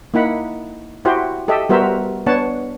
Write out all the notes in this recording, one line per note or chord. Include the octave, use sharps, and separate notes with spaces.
A#3 D#4 E4 F#5 B5
E4 F#4 G4 C5
G4 A4 D#5 E5
G3 B3 F#4 A#4 C5 E5
B3 D4 C#5 F#5 A5